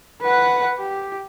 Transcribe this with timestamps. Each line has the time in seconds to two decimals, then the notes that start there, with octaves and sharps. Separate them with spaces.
0.22 B4 F#5
0.79 G4